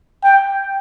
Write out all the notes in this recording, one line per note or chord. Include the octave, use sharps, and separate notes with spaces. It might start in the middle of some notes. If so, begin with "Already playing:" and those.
G5